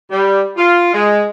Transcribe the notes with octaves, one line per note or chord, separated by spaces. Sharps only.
G3
F4
G#3